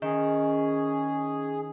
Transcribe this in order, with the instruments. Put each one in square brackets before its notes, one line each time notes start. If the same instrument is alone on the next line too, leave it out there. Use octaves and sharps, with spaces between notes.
[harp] D#3 [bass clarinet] C#4 [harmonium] G#4